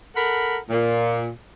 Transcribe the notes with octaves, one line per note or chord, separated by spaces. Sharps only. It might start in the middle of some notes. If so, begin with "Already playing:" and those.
A4 A#4 F#5 B5
A#2